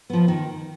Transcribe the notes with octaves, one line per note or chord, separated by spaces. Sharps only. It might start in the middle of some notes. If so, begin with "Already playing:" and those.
F3 B3
D#3